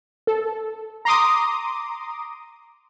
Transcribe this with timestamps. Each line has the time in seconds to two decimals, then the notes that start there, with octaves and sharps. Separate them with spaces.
0.27 A4
1.05 A#5 C6 D6 D#6